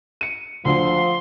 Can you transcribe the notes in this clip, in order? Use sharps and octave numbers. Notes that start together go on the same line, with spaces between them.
C#7 D#7
D2 D3 F3 C6